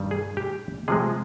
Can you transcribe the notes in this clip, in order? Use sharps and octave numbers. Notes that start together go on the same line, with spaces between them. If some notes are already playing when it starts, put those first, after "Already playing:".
Already playing: G2 D#3 G3
G#4
G4
C3 F3 G#3 G#4